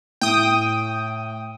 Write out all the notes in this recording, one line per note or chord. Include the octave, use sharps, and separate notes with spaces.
A2 G5 D#6